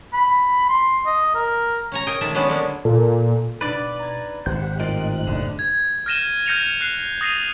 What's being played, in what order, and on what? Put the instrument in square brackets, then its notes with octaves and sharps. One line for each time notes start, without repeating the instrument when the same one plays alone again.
[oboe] B5
C6
D#5
A#4
[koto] C#4 C#5 A#5
G#4 A#4 C#5 D#5 G5 G#5
D#3 G#3 A4 D5 E5
F#3 G#3 B3 C#4 D4
D3 F#3 G#3 A#3 C#4 D4
[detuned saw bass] A#2 [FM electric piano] A4
[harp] B2 D4 D#4 [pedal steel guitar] B4 D5
[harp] A#5 G#6
[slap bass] G#1 [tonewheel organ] G4 C5 F#5 [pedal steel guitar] G6
[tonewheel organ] A2 D#4 F#6 [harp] C4 G4 [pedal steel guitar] F4 A#4 D#5
[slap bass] F#1 E2 [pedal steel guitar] D3
[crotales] G#6
F6 G6 A#6 D#7 E7 G7
F6 G6 A#6 C#7 D#7 F7
F#6 C7
D#6 A6 A#6 C7 D#7 F7